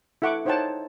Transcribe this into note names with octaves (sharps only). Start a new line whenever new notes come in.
E4 A4 F#5 C#6 D6
D#4 C5 C#5 F#5 G5 A5